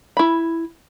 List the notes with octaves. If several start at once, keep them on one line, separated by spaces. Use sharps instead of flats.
E4 B5